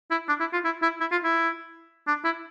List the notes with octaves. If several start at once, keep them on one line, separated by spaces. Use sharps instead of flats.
E4
D4
E4
F4
E4
E4
E4
F4
E4
D4
E4